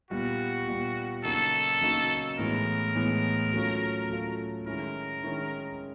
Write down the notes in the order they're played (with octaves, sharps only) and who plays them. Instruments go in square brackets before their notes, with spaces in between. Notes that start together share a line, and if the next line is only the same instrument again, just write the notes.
[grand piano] A#2 G3 B3 [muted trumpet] F#4
[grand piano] A#2 G3 B3
[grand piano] C#3 F#3 A#3 D#4 F#4 [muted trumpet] A4
[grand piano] C#3 F#3 A#3 D#4 F#4
[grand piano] A2 E3 G#3 B3 [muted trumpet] A#4
[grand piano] A2 E3 G#3 B3
F#3 A3 C#4 F4
F#3 A3 C#4 F4
[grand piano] D#3 G#3 C#4 E4 [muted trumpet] A#4
[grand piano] D#3 G#3 C#4 E4